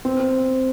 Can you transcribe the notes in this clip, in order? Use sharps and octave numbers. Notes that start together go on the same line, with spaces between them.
C4
C4